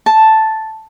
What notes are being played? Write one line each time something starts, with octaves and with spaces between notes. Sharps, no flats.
A5